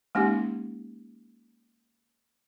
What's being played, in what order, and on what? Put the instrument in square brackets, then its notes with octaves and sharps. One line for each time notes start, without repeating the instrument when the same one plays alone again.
[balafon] G#3 A#3 C#4 D#4 G4